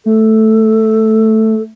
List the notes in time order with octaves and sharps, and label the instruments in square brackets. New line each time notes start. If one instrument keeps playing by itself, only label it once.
[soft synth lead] A3 [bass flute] A4